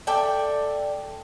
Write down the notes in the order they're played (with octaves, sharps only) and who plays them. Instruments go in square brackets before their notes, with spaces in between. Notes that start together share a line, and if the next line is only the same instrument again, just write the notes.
[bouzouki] A4 D5 E5 G5